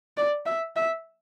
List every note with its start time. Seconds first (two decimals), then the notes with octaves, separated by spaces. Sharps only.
0.17 D5
0.46 E5
0.76 E5